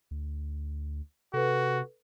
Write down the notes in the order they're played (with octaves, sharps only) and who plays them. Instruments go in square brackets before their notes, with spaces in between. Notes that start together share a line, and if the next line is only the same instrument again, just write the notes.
[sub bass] D2
[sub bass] C3 [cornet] F#4 [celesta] A4 B4